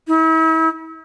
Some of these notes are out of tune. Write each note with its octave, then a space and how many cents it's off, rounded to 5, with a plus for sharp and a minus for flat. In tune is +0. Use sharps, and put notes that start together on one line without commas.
E4 -40